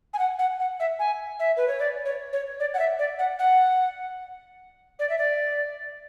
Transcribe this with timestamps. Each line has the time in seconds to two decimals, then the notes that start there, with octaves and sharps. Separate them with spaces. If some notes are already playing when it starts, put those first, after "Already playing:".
0.13 G#5
0.19 F#5
0.39 F#5
0.60 F#5
0.80 E5
0.99 G#5
1.39 E5
1.57 B4
1.68 C#5
1.79 D5
2.05 C#5
2.33 C#5
2.60 D5
2.74 F#5
2.79 E5
2.99 D5
3.19 F#5
3.39 F#5
4.99 D5
5.09 E5
5.18 D5